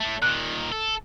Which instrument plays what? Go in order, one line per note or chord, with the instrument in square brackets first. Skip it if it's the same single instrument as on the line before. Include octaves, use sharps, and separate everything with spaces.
[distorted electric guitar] A2 A3
[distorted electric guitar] A#2 D#3 [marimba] F#6
[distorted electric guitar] A4